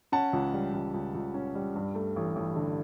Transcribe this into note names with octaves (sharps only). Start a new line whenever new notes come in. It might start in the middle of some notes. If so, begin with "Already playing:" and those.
C#4 F#5 A5
C#2
G3
C#2
C#2
C#2
C#4
G3
G2
A3
A1
A1
D3